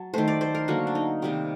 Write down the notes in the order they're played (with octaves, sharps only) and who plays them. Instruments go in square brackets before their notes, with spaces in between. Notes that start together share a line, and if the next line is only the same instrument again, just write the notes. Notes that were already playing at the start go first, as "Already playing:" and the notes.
Already playing: [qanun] F#3 A5
D#3 A3 C5
D5
C5
A#4
D3 F#3 A#3 F#4
D4
D#4
C3 D#3 G3 A#3 C4